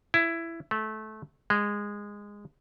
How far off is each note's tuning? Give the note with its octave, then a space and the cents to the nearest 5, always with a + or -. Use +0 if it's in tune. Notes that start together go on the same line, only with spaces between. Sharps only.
E4 +15
A3 -20
G#3 -15